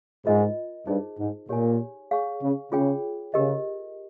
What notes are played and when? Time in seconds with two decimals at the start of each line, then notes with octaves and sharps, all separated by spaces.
0.26 G#2 F4 A#4 D#5
0.87 G2 D#4 G#4 C5
1.18 G#2
1.49 A#2 G4 C#5 G#5
2.11 G#4 C#5 F5 G#5 C#6
2.42 C#3
2.72 C#3 F4 G#4 C#5 G5
3.34 C#3 G4 A#4 D#5